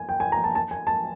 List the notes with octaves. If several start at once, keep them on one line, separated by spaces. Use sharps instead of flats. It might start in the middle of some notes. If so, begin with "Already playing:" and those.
Already playing: G#5
G5
G#5
A#5
A5
A5
G#5
A5